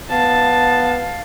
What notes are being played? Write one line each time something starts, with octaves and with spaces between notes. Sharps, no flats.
B3 F5 A5